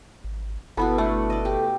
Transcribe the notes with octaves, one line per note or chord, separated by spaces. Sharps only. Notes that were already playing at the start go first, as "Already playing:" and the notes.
G#1
G1 B2 B3 E4 A4
A3 D4 F#5
D5 D#5
G4